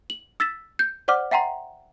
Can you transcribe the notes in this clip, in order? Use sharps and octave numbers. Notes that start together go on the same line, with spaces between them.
F#7
E6 A6 B6 E7
G6
C5 D5 F#5 D6 F6
E5 F#5 G5 A#5 C6